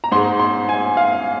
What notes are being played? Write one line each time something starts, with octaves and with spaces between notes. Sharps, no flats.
A#5
G#2 G#3 C6
C6
G#5
F5